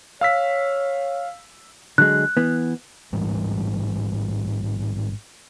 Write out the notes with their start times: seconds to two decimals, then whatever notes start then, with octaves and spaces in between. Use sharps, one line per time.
0.21 C#5 F5 E6 B6
1.98 D3 F#3 G#3 F#6
2.37 E3 B3
3.13 A1 G#2 E3 G3